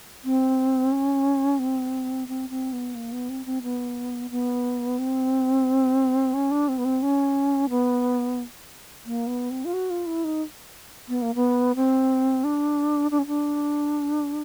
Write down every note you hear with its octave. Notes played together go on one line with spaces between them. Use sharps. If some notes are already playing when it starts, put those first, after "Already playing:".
C4
C#4
C4
C4
C4
B3
A#3
B3
C4
C4
B3
B3
C4
C#4
D4
C4
B3
C4
C#4
B3
A#3
B3
C4
F4
F#4
F4
E4
D#4
B3
A#3
B3
C4
D4
D4
C#4
D4